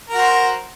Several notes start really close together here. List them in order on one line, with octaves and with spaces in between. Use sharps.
A#4 F#4 C5